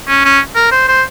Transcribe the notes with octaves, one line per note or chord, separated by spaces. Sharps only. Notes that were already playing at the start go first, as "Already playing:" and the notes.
C#4
C#4
A#4
C5
C5